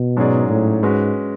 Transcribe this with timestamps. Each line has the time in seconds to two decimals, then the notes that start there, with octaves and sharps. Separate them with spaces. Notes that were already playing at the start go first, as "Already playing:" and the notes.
Already playing: B2
0.17 G#2 F#3 C#4 G#4 D5
0.50 A2
0.83 G#2 G#3 C#4 F#4 B4